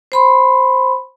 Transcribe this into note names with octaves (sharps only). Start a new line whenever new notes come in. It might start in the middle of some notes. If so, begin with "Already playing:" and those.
C5 B5 C6